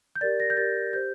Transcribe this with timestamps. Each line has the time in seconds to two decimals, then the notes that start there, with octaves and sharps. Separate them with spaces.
0.15 G6
0.21 G4 A#4 D5 A6
0.40 A#6
0.50 G6
0.57 G4 A#4 D5 A6
0.93 G4 C5 G6